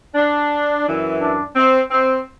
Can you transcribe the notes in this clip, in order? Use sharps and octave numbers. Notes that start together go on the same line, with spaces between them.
D4
F#2 E3
D4
C4
C4